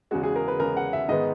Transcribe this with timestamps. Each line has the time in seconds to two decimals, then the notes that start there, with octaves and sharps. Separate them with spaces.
0.11 E2 C#3 G#3 F#4
0.23 G#4
0.36 A#4
0.48 B4
0.60 E2 C#3 G#3 A#4
0.77 F#5
0.93 E5
1.09 G#2 D#3 G#3 B3 D#5